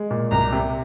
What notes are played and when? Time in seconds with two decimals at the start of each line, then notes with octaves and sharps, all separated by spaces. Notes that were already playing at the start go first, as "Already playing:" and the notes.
Already playing: G#3
0.10 A#2
0.31 C2 A#5
0.52 C3